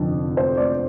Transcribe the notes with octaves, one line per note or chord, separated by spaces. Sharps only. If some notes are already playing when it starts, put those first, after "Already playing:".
Already playing: F1 F2 D3 F3
C5
D5